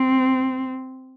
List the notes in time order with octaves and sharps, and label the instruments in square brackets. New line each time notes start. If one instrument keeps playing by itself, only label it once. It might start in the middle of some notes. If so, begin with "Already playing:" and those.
Already playing: [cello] C4